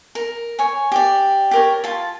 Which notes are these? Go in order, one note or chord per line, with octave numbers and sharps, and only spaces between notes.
A#4
C#5 G#5
G4 D5
G4 A#4 C#5
F4 A5